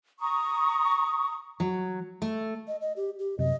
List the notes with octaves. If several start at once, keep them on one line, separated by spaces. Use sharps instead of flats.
A#5 C#6 D#6
F#3
A3
D#5
D#5
G4
G4
F#2 C3 D#5